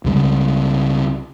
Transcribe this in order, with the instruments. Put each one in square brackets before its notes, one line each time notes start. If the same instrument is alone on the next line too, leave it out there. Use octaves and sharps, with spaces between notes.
[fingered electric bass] C#2 C#3 G3